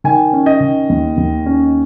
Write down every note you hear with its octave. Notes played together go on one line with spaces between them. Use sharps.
D#3 G#5
C#4
D#5
D#3
D#2
D#2
C#4